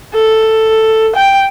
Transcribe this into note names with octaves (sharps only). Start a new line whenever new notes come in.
A4
G5